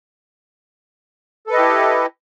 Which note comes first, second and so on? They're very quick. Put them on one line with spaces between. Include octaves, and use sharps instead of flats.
A4 B4 D#5 G4 E4